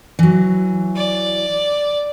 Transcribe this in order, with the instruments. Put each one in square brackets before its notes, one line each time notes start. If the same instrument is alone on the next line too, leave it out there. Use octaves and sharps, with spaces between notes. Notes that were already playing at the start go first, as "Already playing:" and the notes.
[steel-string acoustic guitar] E3 F#3
[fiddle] D5